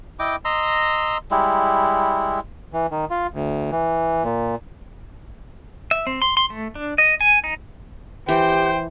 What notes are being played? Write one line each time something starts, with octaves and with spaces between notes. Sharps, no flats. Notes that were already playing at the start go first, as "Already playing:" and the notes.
E4 D#5 G5 D6
D#5 A#5 C6 E6
G3 G#3 E4
E3
D#3
F4
D2
E3
A#2
E5
C4
C6
C6
A3
D4
D#5
G#5
D#4
E3 G4 C5 G5